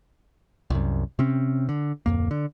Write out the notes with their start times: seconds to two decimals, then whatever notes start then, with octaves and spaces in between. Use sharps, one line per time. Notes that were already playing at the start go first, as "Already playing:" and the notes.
0.70 C2 F#2
1.19 C3 C4 C#4
1.69 D3
2.06 D1 G#1 F2 A#3
2.31 D3